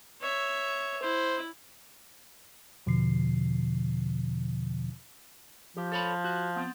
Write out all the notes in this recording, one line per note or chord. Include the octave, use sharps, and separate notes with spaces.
C#5 E5
E4 C5
E2 B2 D3 F3 C7
F3 G4
A4 C#5 B5
F#4
B3 C4